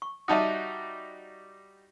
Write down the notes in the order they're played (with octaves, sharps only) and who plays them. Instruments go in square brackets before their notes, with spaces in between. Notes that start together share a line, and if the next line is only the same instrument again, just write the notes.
[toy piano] C#6
[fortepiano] G3 D#4 F#4 [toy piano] E5 A5 D#6